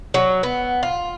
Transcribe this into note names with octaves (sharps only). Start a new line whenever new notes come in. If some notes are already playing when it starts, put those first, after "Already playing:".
F#3
B3
F4